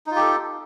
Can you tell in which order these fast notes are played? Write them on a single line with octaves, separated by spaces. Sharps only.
D#4 F4 G4 A4